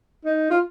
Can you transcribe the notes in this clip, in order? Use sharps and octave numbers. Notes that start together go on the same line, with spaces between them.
D#4
F4